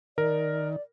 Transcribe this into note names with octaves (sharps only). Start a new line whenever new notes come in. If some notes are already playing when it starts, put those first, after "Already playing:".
D#3 A#4 D5